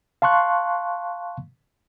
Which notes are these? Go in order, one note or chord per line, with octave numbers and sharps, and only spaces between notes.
F5 A5 C6 C#6 F#6